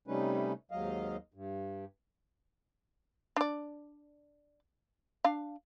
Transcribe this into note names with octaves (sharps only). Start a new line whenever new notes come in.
C3 G3 A3 C#4 D#4 B4
D#2 G#2 F#3 D#5 F5
G2
D4 D5
D4 F5